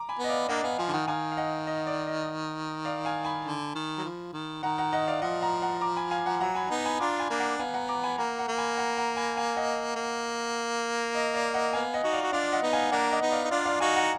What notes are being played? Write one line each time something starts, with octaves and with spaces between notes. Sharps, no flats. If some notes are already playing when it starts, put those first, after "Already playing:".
Already playing: A#5 D6
G#5 B5
B3
D#5
D5 F5
A#3 D4 D#5 F#5
B3 F5 G#5
F3 F5 G#5
D3
D#3 F#5 A#5
D#3 F5 G#5
F5
D#5 F#5
D#5
D5
D#5
D5 F5
F5 G#5
G#5 B5
D3
D#3
F#3
F3
D#3
D#3 F#5 A#5
F#5 A#5
D#5 F#5
D5 F5
F3 D#5 F#5
F#5 A#5
F#5 A#5
A#5 D6
G#5 B5
F5 G#5
F#5 A#5
F#3 F#5 A#5
G#5 B5
B3 D#4
G#5 B5
D4 F4 A#5 D6
G#5 B5
A#3 D4
F#5 A#5
B3 F5 G#5
F#5 A#5
A#5 D6
G#5 B5
A#3 F#5 A#5
F#5 A#5
A#3
G#5 B5
F#5 A#5
F#5 A#5
G#5 B5
F5 G#5
D#5 F#5
A#3
D#5
D5 F5
D#5 F#5
B3 F5 G#5
D#5 F#5
D#4 F#4
D5 F5
F#4
D4 F4 D5 F5
D#5 F#5
B3 D#4
F5 G#5
A#3 D4 F#5 A#5
D#5 F#5
B3 D#4
D5 F5
D#4
D4 F4 D5 F5
D5 F5
D#4 F#4 F5 G#5
F#5 A#5